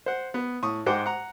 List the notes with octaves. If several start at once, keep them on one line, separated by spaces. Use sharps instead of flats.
C5 F#5
B3
A2 C#6 D#6
G#2 G#3 C5 F#5 G5 D6
F#5 A#5